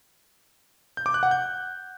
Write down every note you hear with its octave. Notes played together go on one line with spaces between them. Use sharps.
G6
D6
F#6
F#5
G6